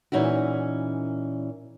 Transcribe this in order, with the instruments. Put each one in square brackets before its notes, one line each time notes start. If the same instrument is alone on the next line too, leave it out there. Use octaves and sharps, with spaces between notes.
[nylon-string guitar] A#2 E3 C#4 D#4 E4 F#4